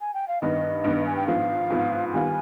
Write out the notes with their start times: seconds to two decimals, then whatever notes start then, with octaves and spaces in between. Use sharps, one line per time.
0.01 G#5
0.14 G5
0.28 F5
0.42 G2 D#3 B3 D#5
0.84 G2 D#3 B3
1.06 G#5
1.16 G5
1.28 G#2 F3 B3 F5
1.70 G#2 F3 B3
2.13 D#3 G3 B3 F4 G#5